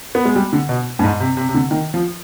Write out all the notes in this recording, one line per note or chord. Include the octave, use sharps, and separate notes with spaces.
B3
G#3
G3
D3
B2
G2
G#2
C3
C3
C3
D3
D#3
F3